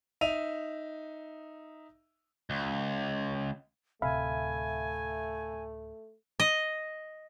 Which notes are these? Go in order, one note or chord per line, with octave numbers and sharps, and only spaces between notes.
D#4 E5 D#7 F7
C#2
D1 C3 A3 E5 F5 G#5 B5
D#5